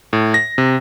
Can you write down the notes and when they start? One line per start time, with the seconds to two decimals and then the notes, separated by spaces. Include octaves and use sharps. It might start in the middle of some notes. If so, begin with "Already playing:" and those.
0.13 A2
0.34 A#6
0.58 C3